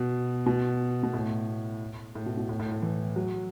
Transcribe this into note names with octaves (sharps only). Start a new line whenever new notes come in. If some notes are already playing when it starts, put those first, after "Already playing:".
Already playing: B2
B2
B2
A2
A2
B2
B2
A2
A2
A2
E3
F#3